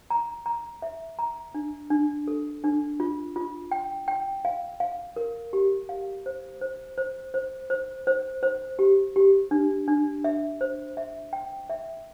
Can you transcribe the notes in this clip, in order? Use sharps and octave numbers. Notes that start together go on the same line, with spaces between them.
A#5
A#5
E5
A#5
D4
D4
A4
D4
F4
F4
G5
G5
F5
F5
A#4
G4
F5
C5
C5
C5
C5
C5
C5
C5
G4
G4
D4
D4
E5
C5
E5
G5
E5